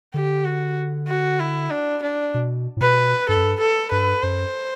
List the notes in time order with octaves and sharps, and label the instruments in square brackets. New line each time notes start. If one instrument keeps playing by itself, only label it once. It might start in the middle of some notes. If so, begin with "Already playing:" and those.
[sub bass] D3 [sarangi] G4
[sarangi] F#4
F#4
E4
D4
D4
[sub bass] B2
A2
[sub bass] B2 [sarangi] B4
[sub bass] G2 [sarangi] A4
[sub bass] F#2
G2
[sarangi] A4
[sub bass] G2 [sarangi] B4
[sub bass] F#2 [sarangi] C5